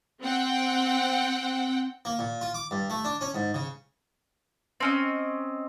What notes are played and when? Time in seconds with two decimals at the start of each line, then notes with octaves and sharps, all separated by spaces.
0.22 C4 F#5 G5
2.05 A#3
2.19 A#2
2.41 F4
2.54 D6
2.71 G2
2.90 A3
3.05 D4
3.21 C#4
3.35 G#2
3.54 C#3
4.80 C4 C#4 D#5